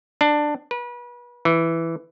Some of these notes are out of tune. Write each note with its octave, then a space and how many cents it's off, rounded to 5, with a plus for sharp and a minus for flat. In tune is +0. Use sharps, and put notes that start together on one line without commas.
D4 +15
B4 -35
E3 +5